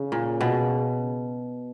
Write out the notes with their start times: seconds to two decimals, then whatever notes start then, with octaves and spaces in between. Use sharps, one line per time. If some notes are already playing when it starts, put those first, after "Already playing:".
Already playing: C#3
0.12 A#2
0.41 B2